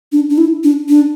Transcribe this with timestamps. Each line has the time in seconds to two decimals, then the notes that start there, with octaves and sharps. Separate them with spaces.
0.12 D4
0.30 D4
0.38 E4
0.64 D4
0.89 D4